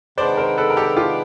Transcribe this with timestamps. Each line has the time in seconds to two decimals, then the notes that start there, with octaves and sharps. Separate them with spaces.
0.18 C3 D#3 G#3 B3 D4 C5 D5
0.37 A#4 C5
0.58 A4 B4
0.70 A#4
0.77 G4 A4
0.96 F4 G4